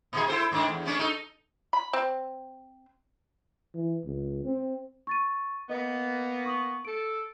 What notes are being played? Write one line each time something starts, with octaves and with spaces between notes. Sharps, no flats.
A#2 D#3 G#4
E4 A4 C5
G#2 D#3 D4
E2
A3 C#4 D4
D#4 A4
B5
C4
E3
C#2
C4
C#6 A6 D#7
A#3 B3 D#5
C#6 D#6 F#7
A4 D7